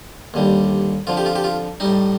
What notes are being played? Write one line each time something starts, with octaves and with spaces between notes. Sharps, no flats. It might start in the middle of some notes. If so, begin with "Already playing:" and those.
D#2 D3 G3
F2 D3 F3 F4
G4
F4
G4
F4
A2 G3 D#4